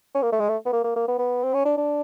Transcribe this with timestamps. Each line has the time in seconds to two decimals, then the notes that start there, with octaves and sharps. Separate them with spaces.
0.15 C#4
0.22 A#3
0.32 A3
0.40 G#3
0.49 A3
0.66 B3
0.73 A#3
0.84 A#3
0.96 A#3
1.08 B3
1.19 B3
1.43 C4
1.54 C#4
1.65 D4
1.77 D4